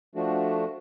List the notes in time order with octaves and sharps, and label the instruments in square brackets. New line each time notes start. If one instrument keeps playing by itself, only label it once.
[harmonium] F3 A3 D4 F#4